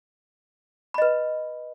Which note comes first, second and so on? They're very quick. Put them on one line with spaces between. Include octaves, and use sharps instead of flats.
B5 D#5 B4